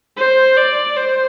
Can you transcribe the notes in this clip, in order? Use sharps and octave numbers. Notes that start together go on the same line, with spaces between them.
C5
D5
C5